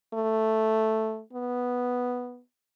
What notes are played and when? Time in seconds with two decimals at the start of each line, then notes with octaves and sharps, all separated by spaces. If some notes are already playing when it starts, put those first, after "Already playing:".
0.14 A3
1.33 B3